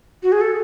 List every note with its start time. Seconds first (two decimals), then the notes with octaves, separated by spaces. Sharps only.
0.23 F#4
0.32 G#4
0.41 A4